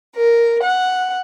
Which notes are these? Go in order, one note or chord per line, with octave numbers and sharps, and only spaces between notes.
A#4
F#5